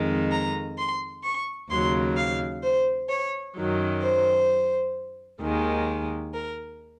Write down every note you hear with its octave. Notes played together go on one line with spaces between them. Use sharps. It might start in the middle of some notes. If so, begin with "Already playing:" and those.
Already playing: F2 D#3 G#3
A#5
C6
C#6
D#2 C#3 F#3 C6
F5
C5
C#5
F#2 D#3 F#3
C5
D#2 D#3 G#3
A#4